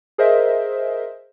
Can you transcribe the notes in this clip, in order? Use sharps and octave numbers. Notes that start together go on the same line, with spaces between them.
G#4 A#4 C5 D#5 E5